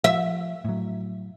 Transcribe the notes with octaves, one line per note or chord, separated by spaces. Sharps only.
F3 E5
A2 F#3